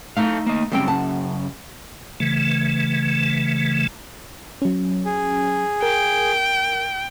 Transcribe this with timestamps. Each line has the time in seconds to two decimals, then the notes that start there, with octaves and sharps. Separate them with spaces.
0.17 A3 D#4 A4 F5
0.46 A#3 D#5
0.72 F#2 C#3 G3 C4 G5
0.87 F#5 A5
2.20 C#3 E3 A3
4.62 F#3 C#4
5.05 G#4
5.83 A#4 G5